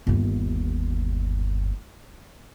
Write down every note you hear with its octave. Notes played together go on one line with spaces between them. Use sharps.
G1 D#2